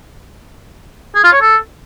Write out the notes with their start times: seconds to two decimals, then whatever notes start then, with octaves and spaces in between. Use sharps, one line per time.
1.15 G#4
1.24 F4
1.33 C#5
1.41 A4